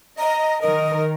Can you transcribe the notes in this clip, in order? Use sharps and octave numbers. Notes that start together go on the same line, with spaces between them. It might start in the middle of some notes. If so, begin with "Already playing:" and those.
D#5 A#5
D#3 A#4 D#5